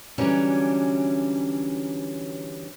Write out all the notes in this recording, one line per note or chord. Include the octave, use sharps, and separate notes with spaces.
D3 E3 F#3 G3 C#4 D4